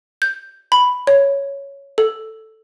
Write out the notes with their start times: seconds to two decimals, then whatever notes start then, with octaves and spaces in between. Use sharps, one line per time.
0.22 G6
0.72 B5
1.07 C#5
1.98 A4